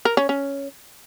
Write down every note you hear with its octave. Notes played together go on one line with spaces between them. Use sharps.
A#4
C#4
C#4